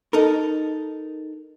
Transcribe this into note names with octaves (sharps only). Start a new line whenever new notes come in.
D#4 A4 A#4